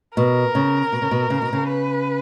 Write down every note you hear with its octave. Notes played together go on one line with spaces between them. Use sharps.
B2 A#4
C#3
B2
C#3
B2
C#3
B2
C#3
B4